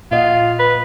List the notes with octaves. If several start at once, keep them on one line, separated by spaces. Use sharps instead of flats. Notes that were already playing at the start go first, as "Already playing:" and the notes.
A#2 F4 D#5 F#5
B4